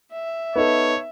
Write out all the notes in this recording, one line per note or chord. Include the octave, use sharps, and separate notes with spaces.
E5
B3 D#4 A4 C#5